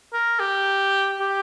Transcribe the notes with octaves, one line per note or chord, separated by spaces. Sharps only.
A#4
G4
G4